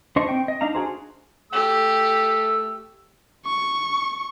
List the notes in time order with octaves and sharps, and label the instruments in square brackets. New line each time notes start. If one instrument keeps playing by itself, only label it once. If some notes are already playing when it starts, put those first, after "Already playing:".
[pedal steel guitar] D4 C5 D#5 C#6
C4 G5
D#5
D4 D#4 F5 A#5
D4 F#4 G#4 C5
[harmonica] A3 E6 [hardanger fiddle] G4
[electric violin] C#6